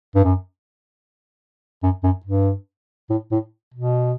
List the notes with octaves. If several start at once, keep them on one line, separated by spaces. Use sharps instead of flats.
G2
F#2
F#2
F#2
G2
A2
A2
B2